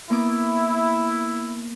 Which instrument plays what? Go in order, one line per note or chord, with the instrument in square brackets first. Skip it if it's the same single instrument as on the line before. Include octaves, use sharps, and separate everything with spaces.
[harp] A#3 B3 D6 [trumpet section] E4